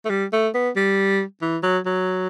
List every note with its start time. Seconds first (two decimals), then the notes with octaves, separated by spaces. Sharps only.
0.05 A3
0.10 G3
0.33 A3
0.54 B3
0.76 G3
1.42 E3
1.63 F#3
1.86 F#3